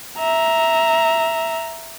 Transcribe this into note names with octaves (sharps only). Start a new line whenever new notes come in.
E5 A#5